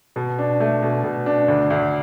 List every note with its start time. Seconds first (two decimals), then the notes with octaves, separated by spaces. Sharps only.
0.16 B2
0.39 D4
0.60 A3
0.82 B2
1.04 B2
1.26 D4
1.48 D2
1.70 D2